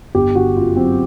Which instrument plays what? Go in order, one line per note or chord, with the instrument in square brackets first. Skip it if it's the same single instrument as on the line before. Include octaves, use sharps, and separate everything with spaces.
[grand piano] G1 G4
D3 F#4
F#2 F4
F#3 C4